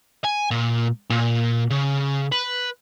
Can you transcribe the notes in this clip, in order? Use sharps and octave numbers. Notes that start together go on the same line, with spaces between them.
G#5
A#2
A#2
C#3
B4